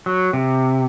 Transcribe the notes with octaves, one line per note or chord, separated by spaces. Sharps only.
F#3
C3